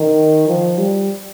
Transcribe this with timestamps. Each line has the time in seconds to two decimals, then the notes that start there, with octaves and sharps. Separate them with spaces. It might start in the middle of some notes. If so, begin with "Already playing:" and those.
Already playing: D#3
0.48 F3
0.78 G3